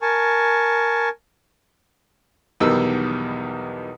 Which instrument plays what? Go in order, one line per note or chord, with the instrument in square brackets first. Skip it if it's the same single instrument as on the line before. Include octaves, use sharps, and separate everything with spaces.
[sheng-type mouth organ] A#4 G#5 A5 C#6
[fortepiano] B1 E2 B2 D#3 G3 E6